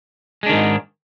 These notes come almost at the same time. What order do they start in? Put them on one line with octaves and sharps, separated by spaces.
G#3 D4 D#3 G#2